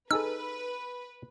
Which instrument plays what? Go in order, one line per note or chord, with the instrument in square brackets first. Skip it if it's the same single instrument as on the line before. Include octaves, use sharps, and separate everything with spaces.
[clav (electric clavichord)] D#4 G#4 A4 [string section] B4 [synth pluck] E6